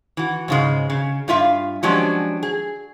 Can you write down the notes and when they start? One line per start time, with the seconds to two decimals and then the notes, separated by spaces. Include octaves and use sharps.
0.17 E3 F#4
0.48 G#2 C#3 G#3
0.90 C#3
1.28 G2 F4 E5 F5
1.83 F3 F#3 G#3 C#4 D4 G4
2.43 G#4